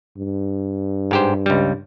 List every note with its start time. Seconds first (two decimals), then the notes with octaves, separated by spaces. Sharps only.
0.18 G2
1.11 G#2 G4 C5
1.46 C#2 G3